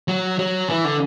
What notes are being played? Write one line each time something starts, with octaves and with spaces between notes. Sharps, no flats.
F#3
F#3
E3
D3